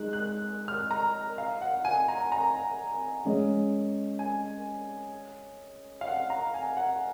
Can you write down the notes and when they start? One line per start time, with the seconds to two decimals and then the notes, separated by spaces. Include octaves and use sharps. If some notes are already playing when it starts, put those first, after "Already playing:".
Already playing: G#3 D#4 G#4 F#6
0.13 F#6
0.68 F6
0.91 A#5
1.38 F5
1.61 F#5
1.85 G#5
2.08 A#5
2.32 A#5
3.25 G#3 C#4 G#4
4.19 G#5
6.01 F5
6.07 F#5
6.30 A#5
6.54 G#5
6.77 F#5